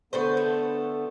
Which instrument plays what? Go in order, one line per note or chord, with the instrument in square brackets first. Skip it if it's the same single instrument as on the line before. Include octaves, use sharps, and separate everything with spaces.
[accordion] D3 B3 [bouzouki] A3 B4 C5
[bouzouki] A3